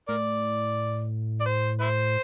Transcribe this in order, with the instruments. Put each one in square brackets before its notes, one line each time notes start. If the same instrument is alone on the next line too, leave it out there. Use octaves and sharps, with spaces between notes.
[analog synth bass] A2 [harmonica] A#4 D5
[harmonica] D5
C5
E4 C5